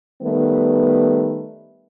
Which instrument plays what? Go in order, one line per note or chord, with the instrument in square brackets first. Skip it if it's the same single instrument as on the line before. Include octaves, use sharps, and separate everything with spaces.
[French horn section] D#3 G3 A3 B3